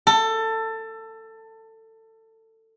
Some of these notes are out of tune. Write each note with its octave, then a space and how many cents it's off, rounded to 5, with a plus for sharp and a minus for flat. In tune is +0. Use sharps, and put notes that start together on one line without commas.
A4 +20